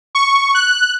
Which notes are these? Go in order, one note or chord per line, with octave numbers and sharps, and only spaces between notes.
C#6
F#6